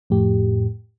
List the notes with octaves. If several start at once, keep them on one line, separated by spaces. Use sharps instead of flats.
F2 A2 G4